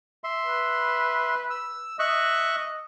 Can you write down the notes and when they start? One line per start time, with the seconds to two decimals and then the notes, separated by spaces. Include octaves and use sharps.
0.24 E5 C6
0.46 B4
1.50 E6
1.99 D#5 E5 C#6 F#6